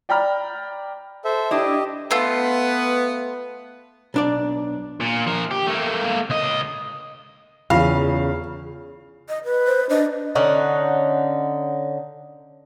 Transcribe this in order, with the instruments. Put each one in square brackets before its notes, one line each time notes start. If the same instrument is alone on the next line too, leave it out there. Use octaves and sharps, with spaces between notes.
[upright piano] D5 G5 A#5 B5 F6
[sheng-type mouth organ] A4 C5 E5
[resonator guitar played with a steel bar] D4 E4 [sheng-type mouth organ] G4 D#5
[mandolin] A3 F4 [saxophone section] B3 B4
[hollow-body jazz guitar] B1 D4 D5
[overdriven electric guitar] A#2
F3 A#4
G4
A3 A#3
C#2 D#5
[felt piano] E2 [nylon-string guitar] C#3 [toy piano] F4 B5 [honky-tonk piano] F5
[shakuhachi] D#5
B4
[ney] C5
[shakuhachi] D4 [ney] D#5
[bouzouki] D3 C#4 D#4 F#5